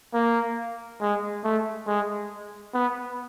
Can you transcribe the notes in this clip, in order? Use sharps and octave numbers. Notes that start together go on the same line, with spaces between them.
A#3
G#3
A3
G#3
B3